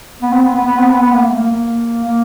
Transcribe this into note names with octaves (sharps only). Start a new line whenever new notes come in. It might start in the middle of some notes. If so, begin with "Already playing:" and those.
B3
C4
B3
B3
B3
C4
B3
B3
A#3
A3
A#3
A#3
A#3